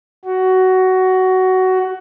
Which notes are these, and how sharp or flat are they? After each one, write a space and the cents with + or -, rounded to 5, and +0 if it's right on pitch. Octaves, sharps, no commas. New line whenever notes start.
F#4 +15